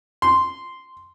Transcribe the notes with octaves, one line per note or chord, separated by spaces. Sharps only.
C6